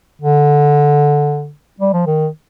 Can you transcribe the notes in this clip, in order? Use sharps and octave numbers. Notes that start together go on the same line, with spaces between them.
D3
G3
F3
D#3